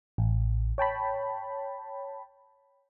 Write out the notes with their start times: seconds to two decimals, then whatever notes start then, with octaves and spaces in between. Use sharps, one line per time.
0.18 A1
0.78 C#5 G5 A5 B5